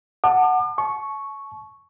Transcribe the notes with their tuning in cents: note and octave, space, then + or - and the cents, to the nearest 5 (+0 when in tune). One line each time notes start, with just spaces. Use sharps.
F#5 +0 A5 +15 D6 +40
A5 -35 C#6 +0